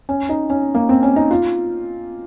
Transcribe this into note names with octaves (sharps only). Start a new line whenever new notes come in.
C#4
D#4
C#4
A#3
C4
C#4
D#4
F4